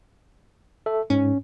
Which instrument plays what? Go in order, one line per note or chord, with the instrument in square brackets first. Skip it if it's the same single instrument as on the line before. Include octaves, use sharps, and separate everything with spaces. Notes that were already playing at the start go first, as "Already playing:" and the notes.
[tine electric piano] A4 E5
[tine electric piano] G#2 [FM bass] C#4